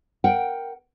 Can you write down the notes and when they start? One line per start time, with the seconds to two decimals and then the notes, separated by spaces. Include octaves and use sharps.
0.24 A#4 F#5 G5